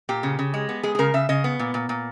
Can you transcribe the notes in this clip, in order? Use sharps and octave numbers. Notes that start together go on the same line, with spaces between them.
A#2 G4
C#3
C#3
G#3
B3
G#3 G#4
G#4
C#3 A#4
C#3 E5
C#3 D#5
B3
A#2
A#2
A#2